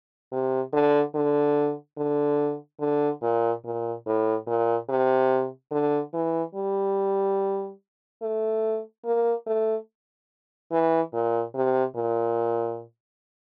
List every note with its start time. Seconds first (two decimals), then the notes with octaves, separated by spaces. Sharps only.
0.32 C3
0.73 D3
1.15 D3
1.98 D3
2.80 D3
3.23 A#2
3.65 A#2
4.06 A2
4.47 A#2
4.89 C3
5.72 D3
6.14 E3
6.55 G3
8.22 A3
9.05 A#3
9.47 A3
10.72 E3
11.14 A#2
11.55 C3
11.96 A#2